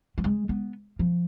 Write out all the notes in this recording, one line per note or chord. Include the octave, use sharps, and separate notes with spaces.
F#3
G#3
B3
F3